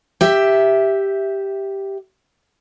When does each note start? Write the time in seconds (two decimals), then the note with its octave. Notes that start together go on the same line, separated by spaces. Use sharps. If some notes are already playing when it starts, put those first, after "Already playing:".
0.21 G4 E5